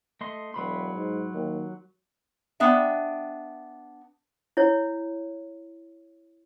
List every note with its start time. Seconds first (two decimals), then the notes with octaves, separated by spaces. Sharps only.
0.21 A3 D#5 C6
0.54 E1 F#3 B5 C6
0.95 G#2
1.34 D#2
2.60 B3 D4 E5 G5
4.57 E4 C#5